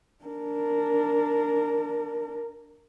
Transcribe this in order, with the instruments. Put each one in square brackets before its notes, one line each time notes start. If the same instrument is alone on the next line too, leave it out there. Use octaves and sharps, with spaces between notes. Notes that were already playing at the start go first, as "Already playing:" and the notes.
[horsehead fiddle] D4 A#4